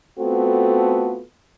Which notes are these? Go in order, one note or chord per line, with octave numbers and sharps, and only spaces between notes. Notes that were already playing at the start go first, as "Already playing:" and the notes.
A3 B3 C4 F4 F#4 A4